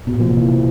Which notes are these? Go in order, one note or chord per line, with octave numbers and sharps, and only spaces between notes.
B2
A#2
F3
C3
E3